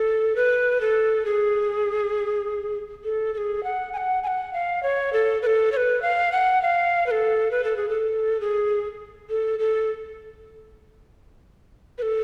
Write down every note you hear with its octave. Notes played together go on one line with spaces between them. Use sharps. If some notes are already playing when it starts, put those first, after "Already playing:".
Already playing: A4
B4
A4
G#4
A4
A4
G#4
F#5
G#5
F#5
G#5
F#5
F5
C#5
A4
B4
A4
C#5
B4
F5
F#5
F5
B4
A4
B4
A4
G#4
A4
G#4
A4
A4
B4
A4